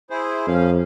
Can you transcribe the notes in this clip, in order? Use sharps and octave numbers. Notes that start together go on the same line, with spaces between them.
E4 G#4 C5
F2 C#4 F5